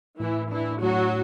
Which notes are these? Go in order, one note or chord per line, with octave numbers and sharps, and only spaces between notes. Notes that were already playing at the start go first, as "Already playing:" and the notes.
A2 E3 E4
E3 D4 E4
A2 F#3 F#4